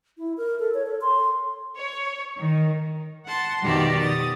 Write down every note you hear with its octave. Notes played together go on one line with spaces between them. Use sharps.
E4
A#4
A4
C#5
A4
C6
C#5
D#3
F#5 A5 C6
F2 B2 D#3 G4 D5 E5
D#6 A6